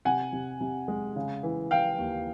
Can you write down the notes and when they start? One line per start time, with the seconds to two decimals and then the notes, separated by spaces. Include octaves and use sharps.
0.05 C3 F#5 G#5
0.33 C3
0.61 C3
0.88 G#3
1.16 C#3
1.43 E3
1.71 E3 F5 G5
1.99 D#2